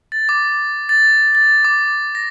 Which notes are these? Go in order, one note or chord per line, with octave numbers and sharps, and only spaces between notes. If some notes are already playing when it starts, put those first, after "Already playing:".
A6
D6
A6
A6
D6
A#6